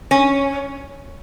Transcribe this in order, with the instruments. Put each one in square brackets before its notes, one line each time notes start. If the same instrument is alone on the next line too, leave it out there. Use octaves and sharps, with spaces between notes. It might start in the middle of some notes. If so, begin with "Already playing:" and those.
[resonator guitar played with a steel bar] C#4